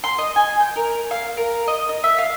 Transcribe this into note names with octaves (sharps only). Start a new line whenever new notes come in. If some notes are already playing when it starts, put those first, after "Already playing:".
C6
D#5
G#5
G5
A#4
F5
A#4
D#5
D#5
E5
F5